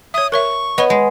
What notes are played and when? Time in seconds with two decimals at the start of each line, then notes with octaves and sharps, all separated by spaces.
0.14 C#5 E5 D#6
0.32 A#4 C#5 E5 C#6
0.78 B3 C#5 D#5
0.90 G#3